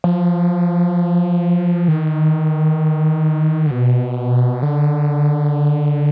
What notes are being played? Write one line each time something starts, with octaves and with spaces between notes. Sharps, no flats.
F3
D#3
D3
B2
D3